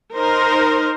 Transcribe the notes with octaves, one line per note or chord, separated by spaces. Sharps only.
D#4 A#4 C5